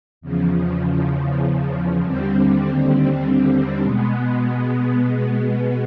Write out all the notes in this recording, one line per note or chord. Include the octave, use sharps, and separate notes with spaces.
E2 C#3 F3
D#2 D3 G3 C4
B2 G#3 B3